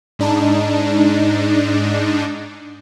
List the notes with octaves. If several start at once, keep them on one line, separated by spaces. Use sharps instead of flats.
G#2 D4 D#4